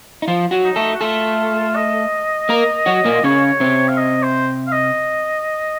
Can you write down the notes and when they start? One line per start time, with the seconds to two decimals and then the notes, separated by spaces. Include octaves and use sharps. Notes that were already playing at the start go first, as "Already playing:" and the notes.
0.22 D#4
0.28 F3 F4
0.51 F#3 F#4
0.64 D#4
0.76 A3 A4
0.94 F#4
1.01 A3 F4 A4
1.75 D#5
2.49 A#3 A#4
2.86 F#3 F#4
3.05 A#2 A#3
3.24 C#3 C#4 C#5
3.60 C3 C4
3.88 F5
3.97 D#5
4.22 C5
4.67 F5
4.72 D#5